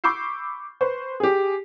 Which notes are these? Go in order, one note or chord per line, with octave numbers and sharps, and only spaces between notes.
B5 C#6 D6 E6 G6 C7
B4 C5 C#6
G4 G#4